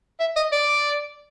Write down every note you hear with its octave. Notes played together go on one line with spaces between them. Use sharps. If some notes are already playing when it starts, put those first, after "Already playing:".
E5
D#5
D5